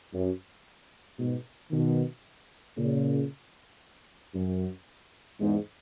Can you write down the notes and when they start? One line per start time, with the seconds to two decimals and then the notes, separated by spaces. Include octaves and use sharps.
0.13 F#2
1.18 G#2 B2
1.70 B2 D#3
2.76 A#2 C#3
4.34 F#2
5.40 E2 G#2